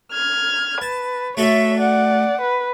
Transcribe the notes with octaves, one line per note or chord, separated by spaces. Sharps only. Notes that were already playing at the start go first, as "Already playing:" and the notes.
F6 G#6
B4 A5
A3 F#4 A4 C#5 E5
D5 F#5
B4